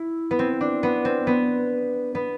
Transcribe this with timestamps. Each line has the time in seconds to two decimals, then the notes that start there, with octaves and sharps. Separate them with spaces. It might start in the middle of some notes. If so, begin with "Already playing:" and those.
Already playing: E4
0.31 B3
0.39 C4
0.61 D4
0.83 B3
1.05 C4
1.27 B3
2.15 B3